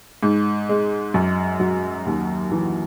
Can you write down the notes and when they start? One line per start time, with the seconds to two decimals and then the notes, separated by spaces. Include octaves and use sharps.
0.23 G#2
0.69 G#3
1.14 F#2
1.60 F#3
2.06 D#2
2.52 E3